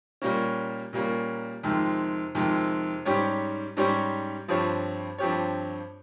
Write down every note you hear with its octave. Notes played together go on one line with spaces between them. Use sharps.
A#2 G3 A#3 C#4
A#2 G3 A#3 C#4
F2 C3 D#3 G#3
F2 C3 D#3 G#3
G#2 G3 C#4 G4 C#5
G#2 G3 C#4 G4 C#5
G2 F3 C4 G4 C#5
G2 F3 C4 G4 C#5